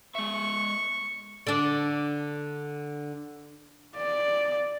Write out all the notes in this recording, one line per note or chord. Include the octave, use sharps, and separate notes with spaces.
G#3 E5 C#6
D3 D4
D5